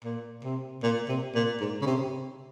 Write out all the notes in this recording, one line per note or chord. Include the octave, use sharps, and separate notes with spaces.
A#2
C3
A#2
C3
A#2
G#2
C#3
C3